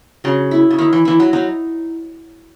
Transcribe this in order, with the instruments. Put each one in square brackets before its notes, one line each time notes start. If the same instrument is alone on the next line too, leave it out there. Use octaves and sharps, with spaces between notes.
[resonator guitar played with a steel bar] C#3 [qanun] F#3
[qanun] E4
[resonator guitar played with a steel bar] C#3
[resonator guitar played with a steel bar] D#3 [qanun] E4
[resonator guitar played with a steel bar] E3
[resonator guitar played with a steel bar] E3 [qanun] E4
[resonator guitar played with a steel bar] F#3
[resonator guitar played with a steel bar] F#3 [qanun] D#4